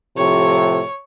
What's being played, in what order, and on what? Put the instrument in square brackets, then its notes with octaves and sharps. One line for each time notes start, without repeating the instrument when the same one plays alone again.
[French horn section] A2 C3 F3 [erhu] C#5